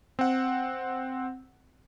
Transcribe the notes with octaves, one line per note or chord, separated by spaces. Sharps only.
C4 F#5